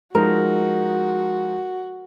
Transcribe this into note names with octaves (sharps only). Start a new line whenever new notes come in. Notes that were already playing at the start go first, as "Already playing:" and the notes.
F3 G#3 D#4 F#4 A#4